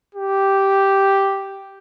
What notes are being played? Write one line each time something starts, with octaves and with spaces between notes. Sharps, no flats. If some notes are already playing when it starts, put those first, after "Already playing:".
G4